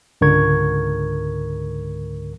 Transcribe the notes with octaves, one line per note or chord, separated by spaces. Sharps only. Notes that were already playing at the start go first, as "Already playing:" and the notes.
C#2 G#2 D3 A#4 C#6 G#6